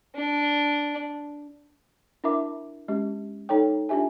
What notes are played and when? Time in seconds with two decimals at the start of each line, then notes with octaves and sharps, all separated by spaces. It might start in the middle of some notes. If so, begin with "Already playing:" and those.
0.15 D4
2.24 D4 E4 A#4 E5 D6
2.88 G#3 C#4 G4
3.49 D#4 A4 C#5 G5
3.89 D4 F4 G4 E5 G#5